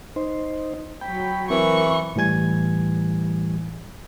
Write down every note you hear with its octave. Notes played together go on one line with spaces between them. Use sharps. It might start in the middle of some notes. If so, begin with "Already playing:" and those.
D#4 C5
F#3 G5 B5
E3 C4 A#4 C#6
A2 E3 G3 G#5 G#6